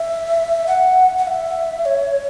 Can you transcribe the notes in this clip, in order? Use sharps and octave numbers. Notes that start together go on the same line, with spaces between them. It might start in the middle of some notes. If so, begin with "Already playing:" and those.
Already playing: E5
F#5
F#5
E5
C#5